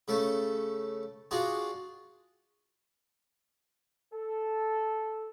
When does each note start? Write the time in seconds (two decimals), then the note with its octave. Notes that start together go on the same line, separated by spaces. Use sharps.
0.08 C#3 A3 A4
1.31 D4 F4 F#4 G#4
4.14 A4